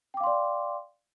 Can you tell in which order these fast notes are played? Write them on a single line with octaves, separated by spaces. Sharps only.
G5 D6 F5 C6 D5